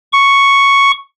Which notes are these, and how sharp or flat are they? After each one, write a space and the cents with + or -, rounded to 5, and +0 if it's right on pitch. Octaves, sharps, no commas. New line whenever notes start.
C#6 +0